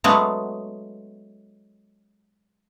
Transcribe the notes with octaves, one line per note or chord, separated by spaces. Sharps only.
F#3 G#3 A3 B3 C#4